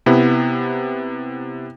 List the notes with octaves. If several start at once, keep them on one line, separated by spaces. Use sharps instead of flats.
C3 B3 E4